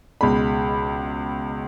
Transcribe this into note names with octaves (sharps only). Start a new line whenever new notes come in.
C#2 B2 G#3 B5